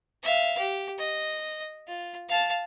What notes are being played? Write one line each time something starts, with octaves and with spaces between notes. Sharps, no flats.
E5 F5
G4
D#5
F4
F5 A5